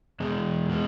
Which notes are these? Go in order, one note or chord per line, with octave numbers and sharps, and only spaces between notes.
E2 B2 G#3
B2 G#3